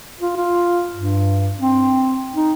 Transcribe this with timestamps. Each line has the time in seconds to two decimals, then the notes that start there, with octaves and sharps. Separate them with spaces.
0.20 F4
0.37 F4
0.94 G2
1.59 C4
2.35 D#4